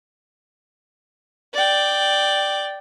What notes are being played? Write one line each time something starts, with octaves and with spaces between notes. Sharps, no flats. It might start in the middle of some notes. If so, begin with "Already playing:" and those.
D5 G5